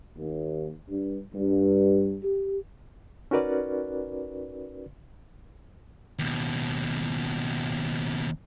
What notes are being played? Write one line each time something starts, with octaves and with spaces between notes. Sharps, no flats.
D#2
G2
G2
G4
C#4 D#4 F#4 A#4 B4 D5
D#2 B2